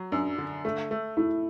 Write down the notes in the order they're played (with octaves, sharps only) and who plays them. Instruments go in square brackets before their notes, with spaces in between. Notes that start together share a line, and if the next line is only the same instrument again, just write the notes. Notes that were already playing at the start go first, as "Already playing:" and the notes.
Already playing: [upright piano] F#3
[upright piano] F#2 [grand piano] D4
[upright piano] D3
A3
A3
[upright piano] A3 [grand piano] E4